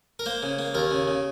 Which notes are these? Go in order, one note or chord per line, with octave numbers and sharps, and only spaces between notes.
A#4
A#3 C5
C#3
A#3
D#2 A#4
C#3
C#3